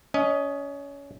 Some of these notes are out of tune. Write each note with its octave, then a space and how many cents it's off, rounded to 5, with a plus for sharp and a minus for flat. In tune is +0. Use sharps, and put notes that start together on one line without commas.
C#4 +25 D#5 +0